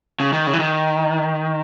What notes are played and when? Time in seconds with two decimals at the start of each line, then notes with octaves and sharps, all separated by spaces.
0.20 C#3
0.33 D#3
0.47 C#3
0.53 E3
0.59 D#3